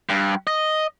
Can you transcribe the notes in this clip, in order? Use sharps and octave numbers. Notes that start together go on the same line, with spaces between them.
G2
D#5